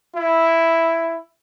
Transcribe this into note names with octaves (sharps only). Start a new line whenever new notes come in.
E4